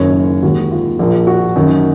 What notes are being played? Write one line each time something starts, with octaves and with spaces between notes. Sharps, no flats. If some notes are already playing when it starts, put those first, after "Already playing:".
Already playing: F#1 F#2 D#3 C#5
D#2 D#3 G#3 F#4
F4
A#1 A#2 F3 A#3
F#4
F#2 D#3 A#3